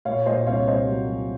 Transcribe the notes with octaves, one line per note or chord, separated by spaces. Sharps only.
A#2 C#5 F5
A#2 C5 D#5
C2 C#5 F5
C2 C5 D#5
F#3
F#3